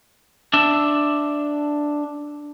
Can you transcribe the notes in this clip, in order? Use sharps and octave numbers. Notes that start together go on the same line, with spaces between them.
D4 E5